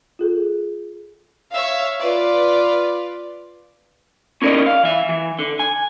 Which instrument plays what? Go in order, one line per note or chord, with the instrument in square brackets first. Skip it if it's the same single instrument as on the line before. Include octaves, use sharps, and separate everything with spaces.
[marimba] F4 G#4 A4
[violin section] C#5 E5 F5
F4 B4 D5
[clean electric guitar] C#4 E4 A#4 C5 D5 D#5
F5
E3 E5
E3
D3
G#5